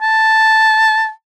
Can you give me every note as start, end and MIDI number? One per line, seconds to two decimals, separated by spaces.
0.02 1.10 81